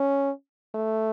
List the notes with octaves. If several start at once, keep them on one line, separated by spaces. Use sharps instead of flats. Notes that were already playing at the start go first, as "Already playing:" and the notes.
Already playing: C#4
A3